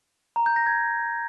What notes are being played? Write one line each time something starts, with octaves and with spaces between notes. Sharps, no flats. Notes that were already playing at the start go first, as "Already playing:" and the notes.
A#5
G6
A#6
G#6